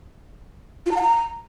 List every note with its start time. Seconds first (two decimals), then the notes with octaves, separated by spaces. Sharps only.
0.86 F4
0.91 A#5
0.96 F#5
1.01 A#5